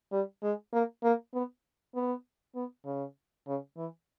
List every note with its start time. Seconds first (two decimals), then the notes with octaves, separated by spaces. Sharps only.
0.12 G3
0.43 G#3
0.73 A#3
1.03 A#3
1.34 B3
1.95 B3
2.55 B3
2.85 C#3
3.47 C#3
3.77 E3